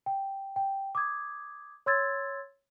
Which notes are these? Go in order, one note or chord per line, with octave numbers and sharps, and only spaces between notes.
G5
G5
D6 D#6 G#6
C#5 C6 E6 G#6 A6